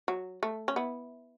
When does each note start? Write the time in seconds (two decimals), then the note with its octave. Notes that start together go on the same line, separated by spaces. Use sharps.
0.08 F#3
0.43 A3
0.68 C#4
0.76 B3 E4